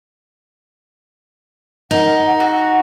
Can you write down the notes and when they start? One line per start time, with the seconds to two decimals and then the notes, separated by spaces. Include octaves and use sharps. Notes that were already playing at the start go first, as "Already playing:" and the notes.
1.91 D#4 A#4 F#5
2.26 F#5
2.40 F#4